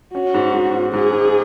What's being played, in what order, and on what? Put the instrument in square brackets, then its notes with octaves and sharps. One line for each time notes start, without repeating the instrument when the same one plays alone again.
[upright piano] C#4 [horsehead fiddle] F#4
[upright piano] G#2
G#2
G#2
[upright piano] G#2 [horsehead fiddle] G#4
[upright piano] G#2